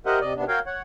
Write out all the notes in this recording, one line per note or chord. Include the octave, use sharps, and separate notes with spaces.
G4 A#4 C5 D#5 E5 F#5
C3 D5 D#5
D#2 C3 B3 D4
F#4 A#4 C#5 F5 G5
C#5 F#5